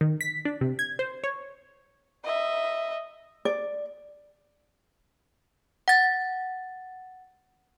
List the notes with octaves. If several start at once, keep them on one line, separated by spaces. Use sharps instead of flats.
D#3
B6
D4
C3
G#6
C5
C#5
D#5 E5
D5
F#5 A6